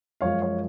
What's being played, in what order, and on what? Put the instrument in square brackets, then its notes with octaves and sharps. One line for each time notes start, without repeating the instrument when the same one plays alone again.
[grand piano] F#2 F3 G#3 C#5 F5
C#5 F5